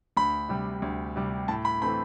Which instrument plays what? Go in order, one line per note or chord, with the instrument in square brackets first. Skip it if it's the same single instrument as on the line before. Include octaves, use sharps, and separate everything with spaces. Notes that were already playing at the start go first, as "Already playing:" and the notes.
[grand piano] D2 B5
C3 G3
D2
C3 G3
A2 A5
B5
E3 A3 C4 B5